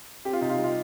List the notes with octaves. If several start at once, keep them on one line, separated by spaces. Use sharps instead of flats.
C4 G4
F4
C3 D#4
F4
G3
F4